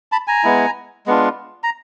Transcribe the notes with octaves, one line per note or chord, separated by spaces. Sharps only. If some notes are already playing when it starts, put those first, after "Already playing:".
A5 B5
G#5 A#5
G#3 B3 E4
G#3 B3 D4 F4
A#5